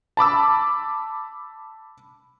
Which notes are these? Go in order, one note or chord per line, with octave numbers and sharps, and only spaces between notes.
A5 B5 D6 E6